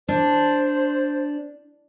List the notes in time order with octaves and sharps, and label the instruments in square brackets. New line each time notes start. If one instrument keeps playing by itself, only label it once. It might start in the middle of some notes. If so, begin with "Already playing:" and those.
[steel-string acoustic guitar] D4 [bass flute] C5